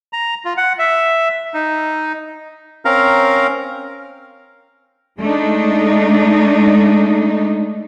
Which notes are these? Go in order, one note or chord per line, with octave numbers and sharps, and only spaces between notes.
A#5
F4
F#5
E5
D#4
C4 C#4 A#4 F5 A#5
G#3 A3 D4 D#4